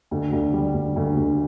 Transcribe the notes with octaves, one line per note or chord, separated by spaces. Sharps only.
D2
D2
G3
D2
D2
D2